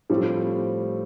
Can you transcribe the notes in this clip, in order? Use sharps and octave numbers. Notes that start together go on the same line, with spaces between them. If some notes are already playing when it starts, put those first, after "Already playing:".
A2 F3 G3 A3 C4